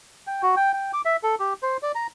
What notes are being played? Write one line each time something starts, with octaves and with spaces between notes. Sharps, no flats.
G5
F#4
G5
G5
D6
E5
A4
G4
C5
D5
A#5